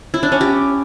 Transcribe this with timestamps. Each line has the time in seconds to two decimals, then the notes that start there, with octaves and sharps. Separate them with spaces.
0.14 E4
0.23 D4
0.32 C#4
0.41 G4